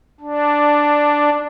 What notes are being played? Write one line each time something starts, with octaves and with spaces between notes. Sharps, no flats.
D4